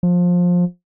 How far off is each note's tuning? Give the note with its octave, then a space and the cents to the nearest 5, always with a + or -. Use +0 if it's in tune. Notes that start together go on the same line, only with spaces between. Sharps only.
F3 +20